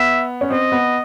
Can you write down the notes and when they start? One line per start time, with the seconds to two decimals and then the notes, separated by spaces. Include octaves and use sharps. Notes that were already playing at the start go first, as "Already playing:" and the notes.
Already playing: B3 E5
0.41 C#4
0.51 C4 D#5
0.72 B3